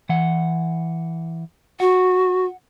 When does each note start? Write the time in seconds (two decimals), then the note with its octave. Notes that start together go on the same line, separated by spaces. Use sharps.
0.09 E3 F#5
1.80 F#4 F#5